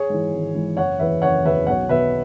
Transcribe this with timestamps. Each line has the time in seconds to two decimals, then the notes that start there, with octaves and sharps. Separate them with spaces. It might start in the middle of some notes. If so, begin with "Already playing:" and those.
Already playing: G#4 C#5
0.09 G#2 E3
0.33 G#1
0.54 G#2 E3
0.77 F#1 C#5 F#5
0.99 E2 E3 B4 E5
1.22 F#1 C#5 F#5
1.45 E2 E3 B4 E5
1.67 B1 C#5 F#5
1.89 B2 B4 E5